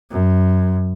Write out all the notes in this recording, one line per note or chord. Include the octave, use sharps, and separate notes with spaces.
F#2